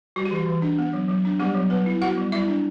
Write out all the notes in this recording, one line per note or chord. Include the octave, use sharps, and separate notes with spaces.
G3 F#4
G4
E3 F#4
E3
D4
B3
F#3
F#3
D4
G3 B3 G4
F#3
F#3 B3 B4
E4
B3 F#4 F#5
G3
G3 E4 E5
D4